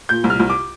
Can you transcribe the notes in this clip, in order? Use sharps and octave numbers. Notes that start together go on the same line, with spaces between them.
A#2 G6
C2
F6
C2
D6